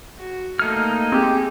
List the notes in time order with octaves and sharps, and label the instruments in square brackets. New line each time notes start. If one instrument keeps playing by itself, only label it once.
[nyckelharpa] F#4
[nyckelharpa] A3 D#5 [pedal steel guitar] A#3 D#4 F6
[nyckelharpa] G#3 [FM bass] C4 [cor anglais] G4